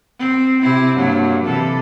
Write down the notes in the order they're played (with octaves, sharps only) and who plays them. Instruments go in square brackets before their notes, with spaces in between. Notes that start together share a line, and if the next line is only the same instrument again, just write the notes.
[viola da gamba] C4
C3 C4 E4
G2 F#3 A#3
C3 E3 A4